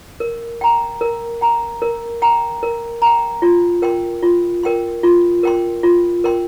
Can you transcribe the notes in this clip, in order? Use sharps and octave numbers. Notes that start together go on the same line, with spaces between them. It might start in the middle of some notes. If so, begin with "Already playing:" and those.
A#4
G5 A#5
A#4
G5 A#5
A#4
G5 A#5
A#4
G5 A#5
F4
A#4 G5 C6
F4
A#4 G5 C6
F4
A#4 G5 C6
F4
A#4 G5 C6